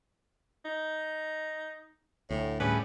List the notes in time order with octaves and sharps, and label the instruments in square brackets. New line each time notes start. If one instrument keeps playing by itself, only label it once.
[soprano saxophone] D#4
[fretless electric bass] D2 [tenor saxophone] A2
[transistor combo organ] A2 G3 G#4 [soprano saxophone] C#4 [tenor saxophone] B4